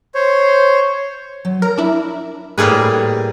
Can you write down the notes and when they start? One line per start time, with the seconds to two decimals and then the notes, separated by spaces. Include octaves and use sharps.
0.15 C5 C#5
1.45 F#3
1.62 A#4 A#5
1.78 D4 E4
2.58 A2 G3 A#3 G#4 B4